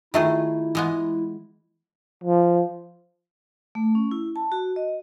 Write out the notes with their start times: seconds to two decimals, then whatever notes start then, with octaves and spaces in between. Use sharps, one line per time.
0.14 D#3 A3 E4 F4 G#4 E5
0.75 E3 G#3 B3
2.24 F3
3.75 A3
3.95 C#4
4.11 E4
4.36 A5
4.52 F#4
4.76 D#5